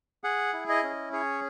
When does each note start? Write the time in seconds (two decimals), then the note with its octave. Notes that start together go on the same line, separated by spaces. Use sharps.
0.24 G#4 F#5
0.53 E4
0.69 D#5
0.83 C#4
1.13 G#4 C#5